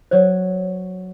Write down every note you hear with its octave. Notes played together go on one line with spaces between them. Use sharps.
F#3 C5 C#5 G#6